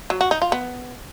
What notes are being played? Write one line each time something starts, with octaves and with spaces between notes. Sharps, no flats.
F#3
F#4
D#4
F4
B3